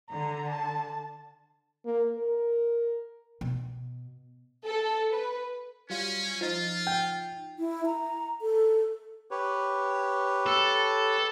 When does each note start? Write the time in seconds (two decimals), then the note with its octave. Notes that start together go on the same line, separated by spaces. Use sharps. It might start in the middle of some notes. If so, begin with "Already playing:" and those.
0.10 D3 A#5
0.48 A5
1.85 A#3
2.18 A#4
3.41 B2
4.67 A4
5.13 B4
5.90 F#3 G3 C#4 F4
6.41 F3 D#4 F4
6.87 G5
7.59 E4
7.86 A#5
8.41 A4
9.31 G4 B4 C#5
10.47 A4